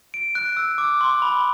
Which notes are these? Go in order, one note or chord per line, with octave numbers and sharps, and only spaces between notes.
D7
F#6
E6
D6
C6
B5